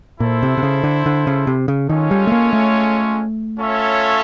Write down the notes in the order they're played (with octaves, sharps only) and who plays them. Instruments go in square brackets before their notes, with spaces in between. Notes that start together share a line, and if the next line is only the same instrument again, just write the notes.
[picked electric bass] A#2 [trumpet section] E4 A4 C5
[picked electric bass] C3
C3
C#3
D3
D3
C#3
C3
C#3
[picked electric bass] D#3 [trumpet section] G#3 C#4 F4 A4 C#5
[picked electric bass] G3
A3
A#3
A3
[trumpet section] C#4 F4 A4 C#5 E5